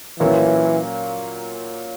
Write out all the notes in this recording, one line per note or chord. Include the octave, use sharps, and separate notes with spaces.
A#2 E3 F#3 A#3 C#4